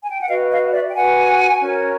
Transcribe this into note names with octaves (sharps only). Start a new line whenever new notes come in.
G#5
G5
F#5
F#4 B4 D#5 F5
D#5 F5
D5 E5
G5
F#4 B4 F#5 G#5
C#4 F#4 A#4 C#5